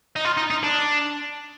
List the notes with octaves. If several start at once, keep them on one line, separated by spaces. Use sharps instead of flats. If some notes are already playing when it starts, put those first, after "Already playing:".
D#4
F4
D#4
D#4
D4